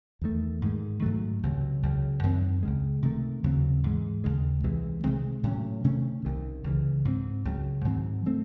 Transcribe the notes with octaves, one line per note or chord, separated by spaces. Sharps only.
E2 D#3 A3
G#2 D#3 G#3
G#2 D#3 F#3 A3
C#2 C3 F#3
C#2 C#3 F#3
F#2 D#3 A3 C4
C#2 C#3 G#3
C3 D#3 A3
D#2 C#3 F#3 C4
G#2 E3 G#3
D#2 C#3 G#3
C2 C3 E3 G#3
C3 D#3 G#3 C4
A2 F#3 C#4
C3 D#3 A3 C#4
C2 C3 D#3
C#2 C#3 E3
G#2 E3 C4
C#2 C#3 F#3
G#2 D#3 F#3 C4
F#3 A3 C4